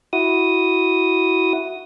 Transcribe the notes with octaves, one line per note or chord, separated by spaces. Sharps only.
E4 F#4 D#6